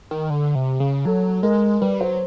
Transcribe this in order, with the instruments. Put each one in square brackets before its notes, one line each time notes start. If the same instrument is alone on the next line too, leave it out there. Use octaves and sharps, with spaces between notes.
[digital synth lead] D#3
D3
C3
C#3
[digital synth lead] F#3 [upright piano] A4
[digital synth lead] G#3 [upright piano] A#4
[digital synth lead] G3 [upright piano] B4
[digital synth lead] F#3 [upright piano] C5